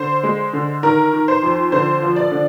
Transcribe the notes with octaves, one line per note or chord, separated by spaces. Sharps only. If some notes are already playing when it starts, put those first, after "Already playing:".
Already playing: D3 C5
G#3
D3
D#3 A#4
D#3
C5
F2
D3 C5
F3
D5
D3